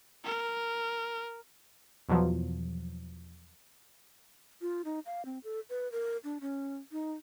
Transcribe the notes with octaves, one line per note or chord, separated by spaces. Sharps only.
A#4
E2 B2 F3 F#3
F4
D#4
F5
C4
A4
B4
A#4
D4
C#4
D#4